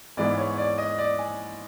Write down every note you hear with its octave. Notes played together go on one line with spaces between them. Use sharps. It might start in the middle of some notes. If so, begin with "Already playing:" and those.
G#2 E3 G#3 B3 D5
C#5
D5
D#5
D5
G#5